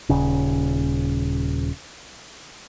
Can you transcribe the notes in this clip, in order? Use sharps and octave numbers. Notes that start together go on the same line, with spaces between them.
D#1 C#3